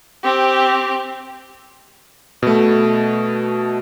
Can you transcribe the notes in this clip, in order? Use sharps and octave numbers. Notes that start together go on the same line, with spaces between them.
C4 G4
B2 A3